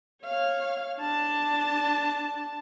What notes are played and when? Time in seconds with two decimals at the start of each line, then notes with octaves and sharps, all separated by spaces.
0.24 C#5 F5
0.99 D4 A5